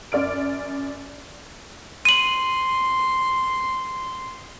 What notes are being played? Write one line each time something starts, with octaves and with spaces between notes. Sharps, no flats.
F#2 D5 F6 D7
C6 D#7 F#7